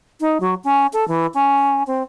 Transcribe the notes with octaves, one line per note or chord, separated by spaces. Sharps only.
D#4
F#3
C#4
A4
E3
C#4
C4